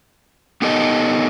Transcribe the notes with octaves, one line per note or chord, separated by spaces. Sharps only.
B3 D#4 G4 A4 A#4 D#5